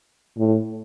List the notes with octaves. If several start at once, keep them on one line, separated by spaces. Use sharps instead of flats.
A2